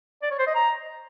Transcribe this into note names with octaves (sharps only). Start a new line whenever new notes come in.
D5
C#5
C5
D#5
A#5